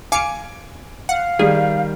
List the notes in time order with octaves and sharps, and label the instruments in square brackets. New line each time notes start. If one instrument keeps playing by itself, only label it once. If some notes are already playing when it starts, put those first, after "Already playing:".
[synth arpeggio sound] F5 D6 C#7 [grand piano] G#5 D7
[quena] F5 [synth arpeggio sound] F#5
[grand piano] D#3 G3 [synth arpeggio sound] G#4